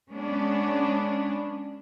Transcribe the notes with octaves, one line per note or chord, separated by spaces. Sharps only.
G#3 B3 C#4 D4